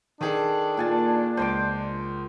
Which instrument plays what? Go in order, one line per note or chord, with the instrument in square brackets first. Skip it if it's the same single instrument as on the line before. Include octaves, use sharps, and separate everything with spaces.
[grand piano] D#3 G#4 A4 [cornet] D4
[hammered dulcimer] A#2 G#5 A5
[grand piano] C#2 [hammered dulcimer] C5 C6 D6